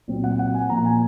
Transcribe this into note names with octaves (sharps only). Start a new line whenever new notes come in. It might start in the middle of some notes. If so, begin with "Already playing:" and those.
A#2 F#3 C4
F#5
F#5
G#5
A#2 F3 A#3 A#5
G#5